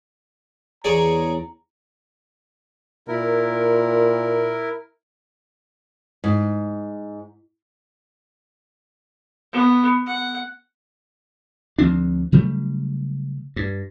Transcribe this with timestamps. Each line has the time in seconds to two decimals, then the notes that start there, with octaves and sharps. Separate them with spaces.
0.84 E2 G#4 C#5 D5 A#5
3.08 A#2 E4 A#4
6.24 G#2
9.53 B3
10.06 F#5
11.79 D2 F3 C4 D4
12.32 C#3 F#3 G3 A3
13.56 G2